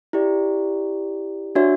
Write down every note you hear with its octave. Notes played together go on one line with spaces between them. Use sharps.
E4 G4 D5
D4 F#4 C#5 E5